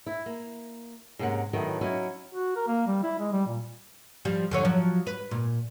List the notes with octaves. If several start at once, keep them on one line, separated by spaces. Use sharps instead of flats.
E4
A#3
G#2 C3 A#3 C#4 F#5
A2 D#3 F#3 A3 B3
F#3 C#4 D#4 E4 F#4
F#4
A#4
A#3
G3
E4
G#3
G3
A#2
F3 G3
F2 D3 C#5
F3 F#3
B4
A#2